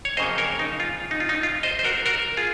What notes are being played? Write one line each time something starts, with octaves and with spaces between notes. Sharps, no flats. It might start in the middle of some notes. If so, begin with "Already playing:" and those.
C#5
F2 C#3 F#3 A#3 C5 D#5
A#4 C#5
D#4
F4
D#4
F4
D#4
F4
C5 D#5
C5
F#4 A#4
F#4 A#4
F4 G#4